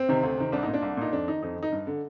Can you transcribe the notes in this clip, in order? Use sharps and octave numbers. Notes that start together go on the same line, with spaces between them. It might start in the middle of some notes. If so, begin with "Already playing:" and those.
Already playing: C4
C3 D#3
D2
C3 D#3
C2 D4
A#2 D#4
D4
C2
A#2 D#4
F2 D4
D#3 D#4
F2 D#4
D#3
D#4
G2
D3